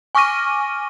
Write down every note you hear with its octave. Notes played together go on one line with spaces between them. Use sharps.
G#5 C#6 D6 F6 A#6 D#7